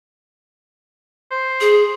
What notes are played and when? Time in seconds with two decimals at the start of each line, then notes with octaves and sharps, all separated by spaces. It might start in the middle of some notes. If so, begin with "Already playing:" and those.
1.31 C5
1.61 G#4